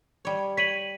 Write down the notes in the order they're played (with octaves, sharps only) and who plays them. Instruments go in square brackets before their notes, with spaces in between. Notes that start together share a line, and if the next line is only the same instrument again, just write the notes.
[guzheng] G3 C#5
[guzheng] C#5 G5 [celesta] B6 D#7 F#7